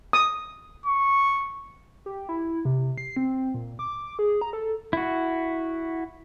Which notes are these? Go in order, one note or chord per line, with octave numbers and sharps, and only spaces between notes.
D#6
C#6
G4
E4
C3
C7
C4
A#2
D6
G#4
A#5
A4
E4 F#4